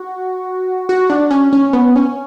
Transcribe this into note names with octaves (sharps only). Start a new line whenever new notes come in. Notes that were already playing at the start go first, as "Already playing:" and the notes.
Already playing: F#4
F#4
D4
C#4
C#4
B3
C#4